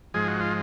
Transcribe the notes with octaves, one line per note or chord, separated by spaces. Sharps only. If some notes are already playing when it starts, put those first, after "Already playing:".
G#2 F3 G#3 G#4
F#4
F4